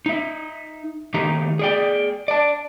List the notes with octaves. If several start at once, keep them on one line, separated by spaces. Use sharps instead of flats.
D#4 E5
D#3 A3 D#4 G4 A#5
G#4 D5 G5
D5 A5